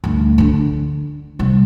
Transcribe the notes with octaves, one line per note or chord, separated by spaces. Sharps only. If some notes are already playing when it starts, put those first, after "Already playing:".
D2 G2
D3 D4
C3 G3